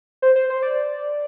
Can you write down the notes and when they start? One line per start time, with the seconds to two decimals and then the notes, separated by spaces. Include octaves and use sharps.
0.22 C5
0.36 C5
0.50 C5
0.63 D5